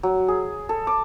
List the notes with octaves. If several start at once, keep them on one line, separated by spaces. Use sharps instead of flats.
F#3
G#4
A4
D6